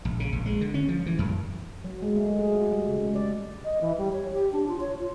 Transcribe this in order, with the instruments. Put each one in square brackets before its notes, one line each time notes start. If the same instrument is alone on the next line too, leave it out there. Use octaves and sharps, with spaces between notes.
[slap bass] A#1
C#3
A#1
G#3
D3
C#4
F3
E3
F#2
[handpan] F#3
G#3
A3
G#4
F#4
G3
C#3
G#3
D5
[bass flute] D#5
E3
G3
C#5
G4
D4
F4
C#5
F4